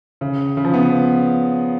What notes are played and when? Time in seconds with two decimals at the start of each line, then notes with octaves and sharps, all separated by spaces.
0.21 C#3
0.57 C#3
0.65 F3
0.74 B3